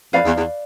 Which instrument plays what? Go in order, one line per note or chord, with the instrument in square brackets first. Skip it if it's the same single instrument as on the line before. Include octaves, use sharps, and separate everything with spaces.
[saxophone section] F2 [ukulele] B4 D5 F5
[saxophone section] E2
E2